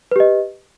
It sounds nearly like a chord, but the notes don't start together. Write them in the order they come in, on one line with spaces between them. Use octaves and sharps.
B4 G4 D#5